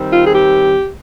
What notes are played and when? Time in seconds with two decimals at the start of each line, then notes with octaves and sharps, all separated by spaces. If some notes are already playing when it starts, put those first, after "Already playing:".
Already playing: D#3 G3 C4
0.11 F4
0.25 G#4
0.32 G4